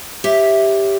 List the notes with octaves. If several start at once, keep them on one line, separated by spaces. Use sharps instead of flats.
G4 C#5 E5